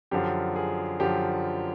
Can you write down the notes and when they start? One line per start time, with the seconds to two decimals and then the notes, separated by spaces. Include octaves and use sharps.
0.11 F#2 D3 F3 G4
0.56 G#4
1.00 F#2 D3 F3 G4